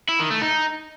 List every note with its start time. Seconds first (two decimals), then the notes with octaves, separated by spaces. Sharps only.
0.09 E4
0.20 D#3
0.31 A3
0.42 D#4